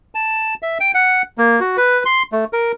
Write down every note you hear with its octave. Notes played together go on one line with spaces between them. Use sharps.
A5
E5
G5
F#5
A#3
F#4
B4
C6
A3
A#4